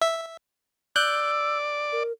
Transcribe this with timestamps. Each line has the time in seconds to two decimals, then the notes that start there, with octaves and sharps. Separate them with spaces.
0.02 E5
0.96 D5 E6 F#6 G6
1.92 A#4